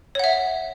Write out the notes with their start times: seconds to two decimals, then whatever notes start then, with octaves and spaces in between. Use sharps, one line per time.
0.15 C#5
0.19 F#5
0.24 E5